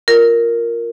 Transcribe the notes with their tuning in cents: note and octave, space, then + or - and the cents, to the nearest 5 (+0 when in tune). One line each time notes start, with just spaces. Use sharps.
F4 +0 A#4 +0